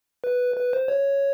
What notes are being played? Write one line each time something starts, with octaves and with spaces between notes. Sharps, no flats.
B4
B4
C5
C#5